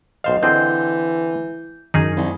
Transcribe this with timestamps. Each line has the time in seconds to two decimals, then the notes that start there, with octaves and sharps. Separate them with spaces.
0.24 B1 C5 D#5 F5
0.43 D3 E3 C4 G#4 G6
1.94 F#2 D#3 D#4 G#4
2.17 C2